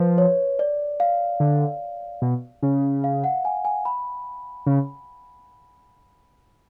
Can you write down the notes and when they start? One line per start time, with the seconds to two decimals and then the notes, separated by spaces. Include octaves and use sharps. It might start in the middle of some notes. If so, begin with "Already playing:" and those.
Already playing: F3 B4
0.18 C#5
0.59 D5
1.00 F5
1.40 D3
2.22 B2
2.63 C#3
3.04 F5
3.24 F#5
3.45 G#5
3.65 G#5
3.85 B5
4.66 C#3